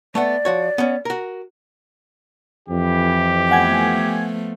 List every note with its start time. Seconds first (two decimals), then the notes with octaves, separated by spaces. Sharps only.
0.15 A3 B3 D5 F#5
0.45 F3 F#4 C#5
0.78 B3 C#4
1.05 F#4 A#4
2.68 F2 E3 G4
3.51 F3 A3 B3 F#5 G#5 G#6